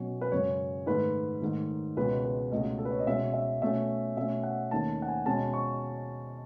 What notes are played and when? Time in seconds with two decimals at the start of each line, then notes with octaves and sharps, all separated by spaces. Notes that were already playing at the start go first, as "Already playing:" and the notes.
Already playing: B2 F#3 C#4
0.21 B4
0.32 F#2 C#3 G#3 C#4 C#5
0.86 G#2 D#3 A3 B4
1.41 G#2 D#3 A3
1.97 C#2 B2 G#3 B3 B4
2.25 B4
2.52 C#2 B2 A3 D#5
2.78 A4
2.85 B4
2.92 C#5
2.99 D#5
3.07 B2 G#3 C#4 E5
3.33 E5
3.62 B2 A3 C#4 E5
4.17 B2 A3 C#4 E5
4.43 F#5
4.71 D#2 D#3 A3 C#4 A5
5.02 F#5
5.08 G#5
5.26 B2 G#3 C#4 A5
5.53 C#6